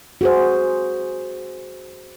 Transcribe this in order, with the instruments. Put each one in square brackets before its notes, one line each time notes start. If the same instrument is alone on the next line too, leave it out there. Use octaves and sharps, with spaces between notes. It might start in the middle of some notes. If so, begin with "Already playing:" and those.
[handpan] F#4 G#4 C5